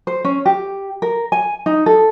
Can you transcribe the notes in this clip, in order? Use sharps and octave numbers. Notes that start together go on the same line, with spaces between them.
C5
C#4
G4
A#4
G#5
D#4
A4